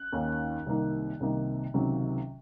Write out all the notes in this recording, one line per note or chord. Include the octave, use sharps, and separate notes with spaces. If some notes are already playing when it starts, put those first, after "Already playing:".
Already playing: F#6
D#2 D#3 A#3 C#4
C2 C3 D#3 A#3 D#4
C2 C3 D#3 A#3 D#4
C#2 C3 D#3 F#3